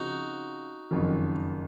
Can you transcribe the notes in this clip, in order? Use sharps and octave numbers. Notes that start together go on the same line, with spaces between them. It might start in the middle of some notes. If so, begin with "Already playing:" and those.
Already playing: C#3 F3 C4 D#4 F#4 G#4
F#1 F2 D#3 F#3